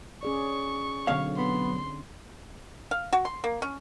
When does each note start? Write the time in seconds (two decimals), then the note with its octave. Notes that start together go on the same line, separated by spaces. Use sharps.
0.23 C#4 G#4 D5 C#6
1.07 B1 D3 C4 C#5 F5
1.37 B3 C6
2.91 F5
3.13 F#4
3.25 C6
3.44 A#3
3.62 C#4